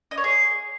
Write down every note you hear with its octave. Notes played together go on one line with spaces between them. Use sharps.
D#5
C#5
G#4